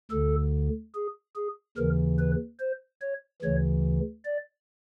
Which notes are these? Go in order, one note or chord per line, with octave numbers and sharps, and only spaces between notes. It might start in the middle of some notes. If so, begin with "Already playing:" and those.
D2 D3 A4
G#4
G#4
D#2 C#3 E3 A#4
B4
C5
C#5
D2 C#3 E3 C#5
D5